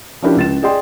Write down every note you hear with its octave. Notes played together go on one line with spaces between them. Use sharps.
F3 C#4 D4 E4 G4 A#4
C#2 A6 E7
G#4 D5 D#5 G5 C6